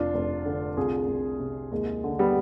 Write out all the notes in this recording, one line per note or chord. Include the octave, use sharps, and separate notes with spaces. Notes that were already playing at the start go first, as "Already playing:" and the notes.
Already playing: F1 D4 F4
F1
D3
C2 F4 G#4
C2
C3
D#2 G#3
D3
G3 B3